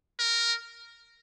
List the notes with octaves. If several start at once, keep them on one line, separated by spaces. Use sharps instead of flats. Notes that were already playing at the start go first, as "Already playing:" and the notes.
A#4